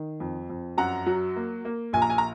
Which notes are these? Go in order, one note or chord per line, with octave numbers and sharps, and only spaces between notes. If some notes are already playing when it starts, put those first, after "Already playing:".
Already playing: D#3
F2
F2
F#2 F#5 A#5
F#3
A#3
A#3
A#1 G#5
A#5
G#5
A#5